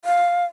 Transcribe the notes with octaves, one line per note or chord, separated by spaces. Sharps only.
F5